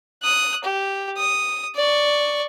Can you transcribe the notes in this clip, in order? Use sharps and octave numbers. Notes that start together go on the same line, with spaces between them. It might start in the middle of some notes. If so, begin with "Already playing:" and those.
D#6 F#6
G4
D#6
D5 C#6